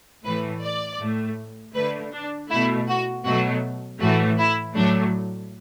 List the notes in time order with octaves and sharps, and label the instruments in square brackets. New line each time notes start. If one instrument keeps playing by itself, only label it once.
[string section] A2 E3 A3 B4
D5
A2 A3
D3 A3 B4
D4
B2 A3 E4
F#4
B2 F#3 A3 F#4
A2 E3 A3 F#4
E4
A2 F#3 A3 D4